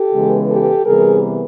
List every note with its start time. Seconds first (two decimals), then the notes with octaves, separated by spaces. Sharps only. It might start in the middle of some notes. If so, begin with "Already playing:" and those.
Already playing: G4 A4
0.14 C#3 E3 G#3 B3
0.50 G4 A4
0.86 C3 E3 G3 B3 G#4 A#4